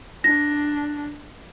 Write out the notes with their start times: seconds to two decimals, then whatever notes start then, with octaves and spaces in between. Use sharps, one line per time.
0.24 D4 A#6